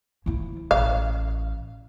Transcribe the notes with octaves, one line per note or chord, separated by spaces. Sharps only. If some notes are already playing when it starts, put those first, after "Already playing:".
F3 E4
A1 F5